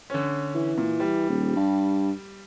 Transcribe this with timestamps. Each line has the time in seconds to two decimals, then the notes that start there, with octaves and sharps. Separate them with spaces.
0.10 D3 C#4
0.55 E3
0.78 A#2
1.00 G3
1.30 D#1
1.56 G2